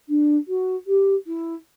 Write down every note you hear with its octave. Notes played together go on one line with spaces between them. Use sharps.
D4
F#4
G4
E4